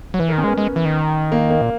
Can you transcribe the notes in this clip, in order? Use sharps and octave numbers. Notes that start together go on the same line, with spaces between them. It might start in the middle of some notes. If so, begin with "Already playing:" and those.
F#3
E3 B4
A#4
D#3
C#4
G#3 B3
G#3
E3
D#3
A#3
A#3
A#2